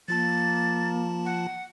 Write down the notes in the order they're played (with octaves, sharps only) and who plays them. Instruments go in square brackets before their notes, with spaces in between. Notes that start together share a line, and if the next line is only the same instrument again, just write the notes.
[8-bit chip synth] F3 F4 A5 [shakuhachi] A#3 [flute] A6
[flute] F#5